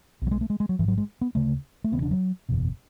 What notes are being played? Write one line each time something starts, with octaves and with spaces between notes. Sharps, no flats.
B1 B2 F#3
G#3
A3
G#3
G#3
F#3
A1 G#2 E3
F#3
G#3
B3
D2 C#3 A3
A3
E1 E2 C#3 B3
D4
F#3
F#1 E2 B2